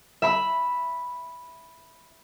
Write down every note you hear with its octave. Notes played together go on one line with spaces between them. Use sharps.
E5 B5